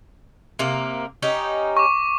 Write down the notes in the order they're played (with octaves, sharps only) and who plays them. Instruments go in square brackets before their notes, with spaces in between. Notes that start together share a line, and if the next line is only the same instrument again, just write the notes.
[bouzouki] C3 A#3
C#4 D#4 G4
[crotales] C#6 D6